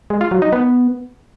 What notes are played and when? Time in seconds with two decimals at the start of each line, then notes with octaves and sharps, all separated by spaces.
0.10 G#3
0.21 F4
0.31 F#3
0.42 D#4
0.53 B3